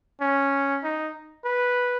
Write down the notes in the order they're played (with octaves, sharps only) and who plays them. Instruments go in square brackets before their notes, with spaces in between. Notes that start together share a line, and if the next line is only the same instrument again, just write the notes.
[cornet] C#4
D#4
B4